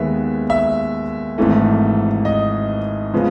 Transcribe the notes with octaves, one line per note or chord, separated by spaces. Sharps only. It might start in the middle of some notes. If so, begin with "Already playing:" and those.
Already playing: D#2 D#3 G#3 B3 E5
E5
G#1 G#2 E3 A3
D#5
C#3 F3 G#3 B3